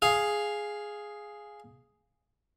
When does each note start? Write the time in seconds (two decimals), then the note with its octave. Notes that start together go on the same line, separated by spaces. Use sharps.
0.02 G#4 F5